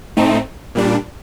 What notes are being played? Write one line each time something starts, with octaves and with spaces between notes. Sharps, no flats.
A2 A3 C4 D#4
A#2 G3 D4